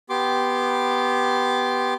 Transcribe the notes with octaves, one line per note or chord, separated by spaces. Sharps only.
B3 G4 C6 D6